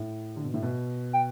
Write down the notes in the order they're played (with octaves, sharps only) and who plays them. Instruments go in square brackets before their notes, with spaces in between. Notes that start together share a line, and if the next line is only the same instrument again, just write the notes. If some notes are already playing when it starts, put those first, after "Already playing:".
Already playing: [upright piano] A2
D3
B2
A2
B2
[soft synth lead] G5